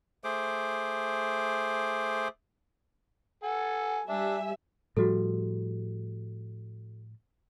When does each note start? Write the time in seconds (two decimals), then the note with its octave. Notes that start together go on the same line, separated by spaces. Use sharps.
0.24 A3 G#4 C5 D6
3.43 A4 F#5 G#5
4.09 G3 D4 E5 G#5
4.97 A2 F3 G3 F#4 A4